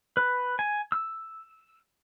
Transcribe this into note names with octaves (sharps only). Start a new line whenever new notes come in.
B4
G#5
E6